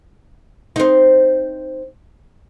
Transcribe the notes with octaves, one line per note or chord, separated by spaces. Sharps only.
C4 D#4